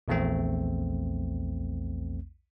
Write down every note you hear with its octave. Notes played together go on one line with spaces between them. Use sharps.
A#1 E2 A3 C4